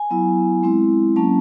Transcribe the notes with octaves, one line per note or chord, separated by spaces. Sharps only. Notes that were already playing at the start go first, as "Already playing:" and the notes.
Already playing: G#5
F#3 B3 E4
G#3 C4 E4
F#3 A#3 C#4 A5